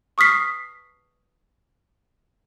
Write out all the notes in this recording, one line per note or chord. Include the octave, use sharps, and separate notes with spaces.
C#6 D#6 F6 B6 C7